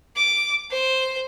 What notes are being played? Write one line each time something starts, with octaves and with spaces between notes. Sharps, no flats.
D6
C5